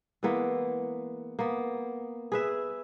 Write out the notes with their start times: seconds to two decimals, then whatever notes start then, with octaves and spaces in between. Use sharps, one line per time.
0.23 E3 G#3 A#3 B3
1.39 A#3 B3
2.32 G#4 B4 E5